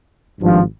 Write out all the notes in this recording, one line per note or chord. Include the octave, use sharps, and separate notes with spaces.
G#1 G2 F3